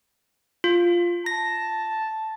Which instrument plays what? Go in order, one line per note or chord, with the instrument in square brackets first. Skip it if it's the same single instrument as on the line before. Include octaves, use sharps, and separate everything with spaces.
[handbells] F4
[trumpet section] A5 [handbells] A#6